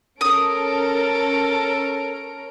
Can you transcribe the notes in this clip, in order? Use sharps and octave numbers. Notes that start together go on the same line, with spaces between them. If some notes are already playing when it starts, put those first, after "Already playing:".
C#4 A4 A#4 D#6 D7